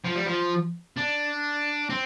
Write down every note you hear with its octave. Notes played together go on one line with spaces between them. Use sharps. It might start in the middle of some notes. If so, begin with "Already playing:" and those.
F3
G3
F3
D4
C4